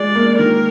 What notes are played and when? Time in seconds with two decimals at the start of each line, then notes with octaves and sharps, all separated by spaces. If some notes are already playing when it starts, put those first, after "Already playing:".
Already playing: G#3 D5
0.15 A#3
0.39 D#3 A#4